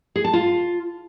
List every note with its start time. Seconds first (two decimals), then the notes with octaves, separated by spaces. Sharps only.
0.16 G#4
0.24 A5
0.33 F4